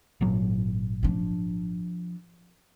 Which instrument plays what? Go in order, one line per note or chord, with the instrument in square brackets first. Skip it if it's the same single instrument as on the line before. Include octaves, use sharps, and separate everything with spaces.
[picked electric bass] G#1 A#2 F#3
[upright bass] F3 D4